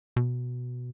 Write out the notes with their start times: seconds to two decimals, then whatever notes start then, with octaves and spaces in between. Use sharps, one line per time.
0.16 B2